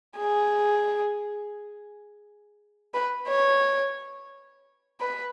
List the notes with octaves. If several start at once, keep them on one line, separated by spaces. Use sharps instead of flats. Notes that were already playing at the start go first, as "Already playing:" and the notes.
G#4
B4
C#5
B4